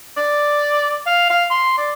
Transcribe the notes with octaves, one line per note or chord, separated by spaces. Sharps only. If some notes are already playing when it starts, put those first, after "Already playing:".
D5
F5
F5
C6
D5